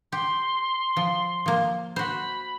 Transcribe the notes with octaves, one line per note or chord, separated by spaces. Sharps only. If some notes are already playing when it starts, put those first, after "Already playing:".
G4 C6
F3
F3 A#3
F#4 C5 B5